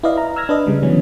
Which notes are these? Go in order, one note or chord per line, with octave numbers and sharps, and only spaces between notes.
E4 B4 D5 D#5 F5
A#5
E6 F6 G#6 A#6
D4 B4 D#5
C#3 G3 G#3
D3 E3 F#3 B3 C#4